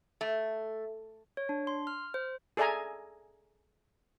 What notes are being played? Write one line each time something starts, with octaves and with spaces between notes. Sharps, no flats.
A3
C#5
D4
C6
F6
C5
G#4 A4 D5 E5 G#5 A#5